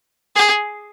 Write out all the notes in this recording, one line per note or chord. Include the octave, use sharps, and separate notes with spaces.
G#4